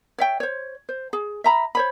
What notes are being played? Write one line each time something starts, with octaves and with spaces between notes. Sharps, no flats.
C#5 E5 G5
C5 C#5
C5
G#4
E5 A#5 B5
C5 C#5 B5